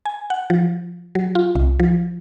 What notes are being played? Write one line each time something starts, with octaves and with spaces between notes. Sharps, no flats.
G#5
F#5
F3
F#3
F4
C2
F3